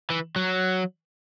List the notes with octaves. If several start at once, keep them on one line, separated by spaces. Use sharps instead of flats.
E3
F#3